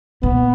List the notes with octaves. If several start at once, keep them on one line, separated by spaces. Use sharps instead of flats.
A#2 B3